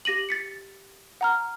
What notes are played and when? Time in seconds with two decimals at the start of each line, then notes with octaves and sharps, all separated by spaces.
0.05 G4 A#6 D#7 F#7
0.29 A6 B6 C#7
1.21 F#5 A#5 F6